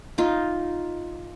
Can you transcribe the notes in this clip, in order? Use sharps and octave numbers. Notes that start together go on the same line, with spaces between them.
D#4 F4